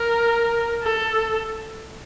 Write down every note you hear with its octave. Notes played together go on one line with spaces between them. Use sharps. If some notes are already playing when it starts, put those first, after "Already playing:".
Already playing: A#4
A4